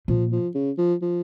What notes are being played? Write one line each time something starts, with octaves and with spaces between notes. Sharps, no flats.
A#2 F3
F3
C#3
F3
F3